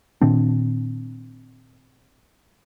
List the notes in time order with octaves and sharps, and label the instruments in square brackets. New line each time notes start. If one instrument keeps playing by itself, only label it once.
[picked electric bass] A#2 D#3 C4 D4